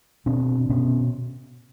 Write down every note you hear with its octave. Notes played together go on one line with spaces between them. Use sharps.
B2 C4 D4
B2 B3 C#4